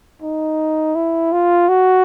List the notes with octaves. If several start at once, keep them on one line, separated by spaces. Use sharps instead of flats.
D#4
E4
F4
F#4